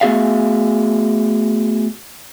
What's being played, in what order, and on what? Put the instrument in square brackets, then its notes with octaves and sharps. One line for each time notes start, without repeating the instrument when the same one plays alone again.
[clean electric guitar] A3 B3 F#4 G#4 E5 F5